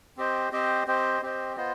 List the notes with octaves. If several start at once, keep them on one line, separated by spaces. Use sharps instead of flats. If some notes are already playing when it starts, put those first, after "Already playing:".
C4 G4 C5 D#5
C4 G4 C5 D#5
C4 G4 C5 D#5
C4 G4 C5 D#5
B3 F4 C5 D#5